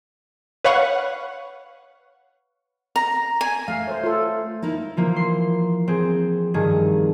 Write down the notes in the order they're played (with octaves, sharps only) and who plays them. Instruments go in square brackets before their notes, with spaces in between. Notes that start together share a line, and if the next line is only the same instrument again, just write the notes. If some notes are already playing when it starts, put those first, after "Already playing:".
[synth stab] B4 C#5 F5 F#5 C#6
[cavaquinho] A#5
G#5
[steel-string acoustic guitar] A3 [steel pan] F5
[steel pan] C5 C#5
F4 A4
[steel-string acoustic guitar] A#3 D#4 E4
[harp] E3 F3 A#3
C6
C4 G#4
G2 D#3 G#4